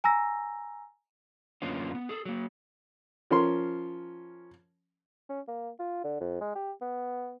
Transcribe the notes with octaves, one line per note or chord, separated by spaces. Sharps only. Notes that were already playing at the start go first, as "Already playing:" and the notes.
G#5 A#5 E6 A#6
F#2 D3 A#3 B3 C#4 F4
B3
G#4 A4
F#3 A#3
F3 C#4 A#4 C6
C#4
A#3
F4
D3
F2
G#3
G4
B3